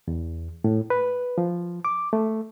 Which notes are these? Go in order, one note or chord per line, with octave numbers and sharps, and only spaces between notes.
E2
A2
B4
F3
D6
A3